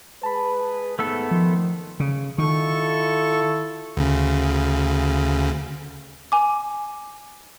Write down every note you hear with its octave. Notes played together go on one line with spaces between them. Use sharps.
G#3 G#4 B4 A5 B5
G#2 A3 B3 A4 E6
D#3 F3 C6
C#3
D#3 E4 F4 A4 C#6
D2 C#3
G#5 D6